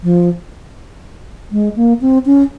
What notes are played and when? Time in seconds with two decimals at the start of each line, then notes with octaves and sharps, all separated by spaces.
0.03 F3
1.52 G#3
1.76 A#3
2.01 C4
2.26 C#4